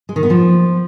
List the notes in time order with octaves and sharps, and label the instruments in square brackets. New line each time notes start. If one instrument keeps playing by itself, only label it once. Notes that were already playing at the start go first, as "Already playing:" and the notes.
[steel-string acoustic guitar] G#3
D#3
B3
F3